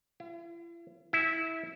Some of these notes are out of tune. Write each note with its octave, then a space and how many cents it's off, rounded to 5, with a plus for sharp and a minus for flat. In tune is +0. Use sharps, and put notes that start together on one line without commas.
E4 +45
E4 -20